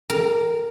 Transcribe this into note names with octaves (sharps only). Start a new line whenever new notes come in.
A#4